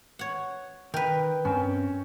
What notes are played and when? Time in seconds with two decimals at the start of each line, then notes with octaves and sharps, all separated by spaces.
0.19 C#5 F#5
0.94 D#3 A#4 B4 G5
1.45 G2 C4 C#4